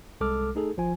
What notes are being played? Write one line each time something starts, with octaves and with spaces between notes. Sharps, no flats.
C2 G#3 A4 D6 F6
A3 D#4 G#4 A4
G#1 F3 F4 G#5